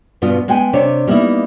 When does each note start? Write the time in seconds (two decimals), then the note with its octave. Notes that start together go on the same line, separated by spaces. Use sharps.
0.22 G2 B2 B3 F4
0.48 G#3 B3 G5 G#5
0.73 C3 D4 C#5
1.07 G3 A#3 B3 D#4 E4